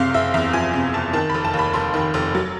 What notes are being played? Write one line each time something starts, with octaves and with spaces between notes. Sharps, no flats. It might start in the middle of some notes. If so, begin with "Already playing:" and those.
Already playing: F#1 C3 F5
F#1 E5
E2 E5
F3 G#5
C3
F#1 A5
D#3 A5
F1 B5
A5
D#2
B5
F1 C6
D#3
F1
F#3